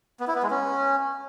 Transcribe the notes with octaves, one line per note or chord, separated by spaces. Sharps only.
B3
E4
B3
G#3
C#4